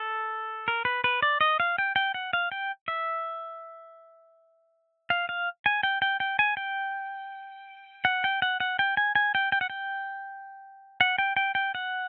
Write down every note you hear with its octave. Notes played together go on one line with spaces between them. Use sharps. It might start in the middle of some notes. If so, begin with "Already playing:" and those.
Already playing: A4
A#4
B4
B4
D5
D#5
F5
G5
G5
F#5
F5
G5
E5
F5
F5
G#5
G5
G5
G5
G#5
G5
F#5
G5
F#5
F#5
G5
G#5
G#5
G5
G5
F#5
G5
F#5
G5
G5
G5
F#5